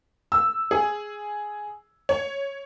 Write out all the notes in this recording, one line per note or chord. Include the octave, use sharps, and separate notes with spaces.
E6
G#4
C#5